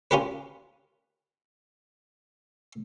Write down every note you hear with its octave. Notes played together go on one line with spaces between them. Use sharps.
C#4 F4 G4 A#4 B4